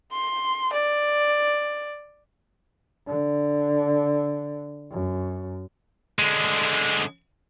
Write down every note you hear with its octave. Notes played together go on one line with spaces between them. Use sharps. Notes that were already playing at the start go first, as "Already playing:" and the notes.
C6
D5
D3
F#2
D3 G#3